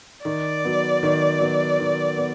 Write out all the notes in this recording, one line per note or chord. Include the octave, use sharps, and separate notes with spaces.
D#3 D5
F#3 B3
D#3
F#3 B3
D#3
B3